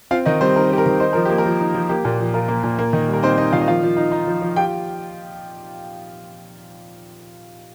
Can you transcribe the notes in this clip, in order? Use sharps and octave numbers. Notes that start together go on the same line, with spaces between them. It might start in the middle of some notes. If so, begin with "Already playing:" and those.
C4 F4 F5
D#3 D#4 D#5
G3 C4 C5
D#4 A#4
C4 G4
A#4
D#3
D#4 C5
F3 A#4
A#3 G4
A#4
F3
D#4
F3
A#3 G4
A#2
F3
F4 A#4
A#3
A#2
A#3
D#3
G3 A#4
C4 D#4 C5
A#3 D#4 D#5
D#3 F4 F5
D#5
F3 F4 F5
F3
D#4
D#4
F3
F3
F4 G4 G5